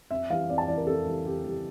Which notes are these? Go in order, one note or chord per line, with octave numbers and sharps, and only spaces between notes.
F2 E5
E3 G3 F5
F2 D5
A5
E3 G3 D5
A#4
F2 A4
E3 G3
F2 G4
E3 G3